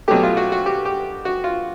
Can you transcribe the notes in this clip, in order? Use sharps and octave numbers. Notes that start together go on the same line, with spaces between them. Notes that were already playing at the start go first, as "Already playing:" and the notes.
B2 F#3 A3 G4
F4
F#4
F#4
G4
G4
F#4
F4